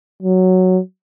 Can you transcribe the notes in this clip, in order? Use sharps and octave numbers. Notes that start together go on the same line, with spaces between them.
F#3